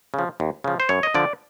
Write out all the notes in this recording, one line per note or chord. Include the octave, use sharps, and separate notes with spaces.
C#3 F3
D#2
C#3 F3
C5
F#2 C#5
D#5
D3 F3 D5